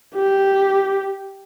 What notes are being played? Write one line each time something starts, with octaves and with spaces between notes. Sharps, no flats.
G4